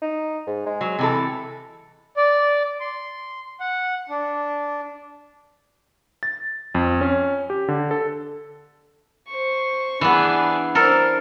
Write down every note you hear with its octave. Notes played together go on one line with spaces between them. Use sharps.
D#4
G#2
G#3
F#3
C3 E3 A4
D5
C6
F#5
D4
A6
F2
C#4
G4
D3
A4
C5 C#6
E3 B3 D4 G#4
D4 A4 A#4 C5